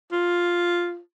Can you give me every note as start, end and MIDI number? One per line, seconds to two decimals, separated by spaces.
0.12 0.99 65